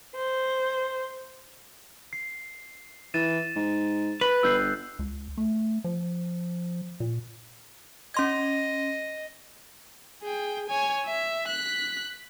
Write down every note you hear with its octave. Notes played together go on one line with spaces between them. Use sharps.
C5
C7
E3 A6 D#7 E7
G#2
B4 F#6
G1 E6 G6 C7
C#2
A3
F3
A#2
C#4 D#5 C6 G#6
G#4 G5
C#5 G#5
E5
F#6 B6